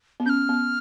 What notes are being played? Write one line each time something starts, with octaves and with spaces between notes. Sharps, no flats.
B3
C#4 G6
F6
B3